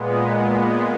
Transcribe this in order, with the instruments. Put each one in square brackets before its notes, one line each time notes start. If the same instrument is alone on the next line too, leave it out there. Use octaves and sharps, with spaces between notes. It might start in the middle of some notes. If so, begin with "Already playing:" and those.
Already playing: [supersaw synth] A#2 G#3 B3